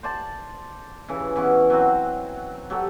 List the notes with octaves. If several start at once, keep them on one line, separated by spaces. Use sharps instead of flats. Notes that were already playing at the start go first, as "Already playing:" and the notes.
C5 D5 A5
C#3 E3
E3 B3 C#4 C#6
F#3 C4 F#4
F#3 G4 A4